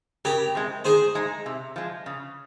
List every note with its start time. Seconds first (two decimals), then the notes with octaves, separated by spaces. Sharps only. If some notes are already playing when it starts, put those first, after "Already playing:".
0.25 C#3 G4 A#4
0.55 G#3 C4
0.85 D#3 G#4 C5
1.15 G#3 D#4
1.46 C3
1.76 F3 G#3
2.06 C#3